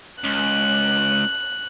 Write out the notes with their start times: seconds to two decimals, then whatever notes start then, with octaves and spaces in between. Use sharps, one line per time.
0.24 C#2 F#6